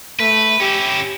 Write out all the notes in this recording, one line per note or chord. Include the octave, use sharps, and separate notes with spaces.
A3 B4
C#4 E4 G4